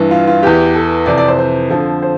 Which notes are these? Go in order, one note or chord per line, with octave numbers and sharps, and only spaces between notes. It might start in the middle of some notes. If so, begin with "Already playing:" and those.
Already playing: G2 E3
F4
F4
E2 E3 G4
A4
F2 C3 E3 D5
D5
C5
C5
F2 D3 F3
C5